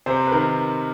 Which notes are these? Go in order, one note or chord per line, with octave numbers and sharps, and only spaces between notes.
C3 C5
B4
D#3 A#4